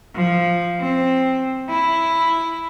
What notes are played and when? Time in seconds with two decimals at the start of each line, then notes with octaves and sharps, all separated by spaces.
0.15 F3
0.80 C4
1.70 E4